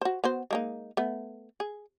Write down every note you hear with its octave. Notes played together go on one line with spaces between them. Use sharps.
F#4 C5
B3 F#4 C5
G#3 A#3 D#4
A3 B3
G#4